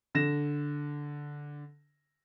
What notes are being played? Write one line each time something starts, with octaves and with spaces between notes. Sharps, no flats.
D3 A#6 E7